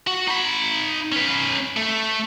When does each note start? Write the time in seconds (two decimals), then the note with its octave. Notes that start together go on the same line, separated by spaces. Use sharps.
0.07 F#4
0.27 D#4 B5
1.12 C#4 B4
1.77 A3